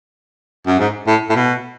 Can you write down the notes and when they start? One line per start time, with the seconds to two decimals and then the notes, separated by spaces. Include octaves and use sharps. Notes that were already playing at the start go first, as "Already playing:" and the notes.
0.67 F#2
0.79 G#2
1.07 A2
1.30 A2
1.36 B2